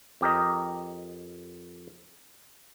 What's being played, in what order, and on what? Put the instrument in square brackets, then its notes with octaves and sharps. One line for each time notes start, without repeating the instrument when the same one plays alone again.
[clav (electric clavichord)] F2 G4 A#4 D#5